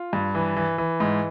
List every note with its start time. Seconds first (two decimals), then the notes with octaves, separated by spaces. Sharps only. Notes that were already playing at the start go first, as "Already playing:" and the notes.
Already playing: F4
0.13 G2
0.35 E3
0.56 E3
0.78 E3
1.00 G#2